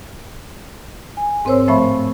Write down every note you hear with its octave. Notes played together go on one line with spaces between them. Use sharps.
G#5
G#2 C4 A#4 C5 C#5 E6
A2 F3 A3 E5 B5 C#6